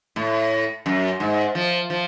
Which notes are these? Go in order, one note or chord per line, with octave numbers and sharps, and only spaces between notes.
A2
F#2
G#2
F3
F3